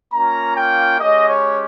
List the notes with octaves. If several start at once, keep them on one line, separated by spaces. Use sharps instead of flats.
A#3 C#4 F4 A#5
G5
G#3 C#4 G4 D#5
C#5